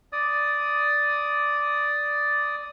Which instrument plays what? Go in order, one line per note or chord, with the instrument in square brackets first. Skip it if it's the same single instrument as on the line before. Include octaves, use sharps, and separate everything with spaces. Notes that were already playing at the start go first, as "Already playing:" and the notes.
[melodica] D5 D#6